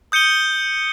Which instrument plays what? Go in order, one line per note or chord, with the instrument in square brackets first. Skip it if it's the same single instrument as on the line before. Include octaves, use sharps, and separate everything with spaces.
[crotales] D#6 G6 C#7 D#7 G7